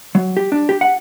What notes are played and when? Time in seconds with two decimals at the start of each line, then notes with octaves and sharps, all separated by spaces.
0.15 F#3
0.37 G4
0.52 D4
0.69 G4
0.81 F#5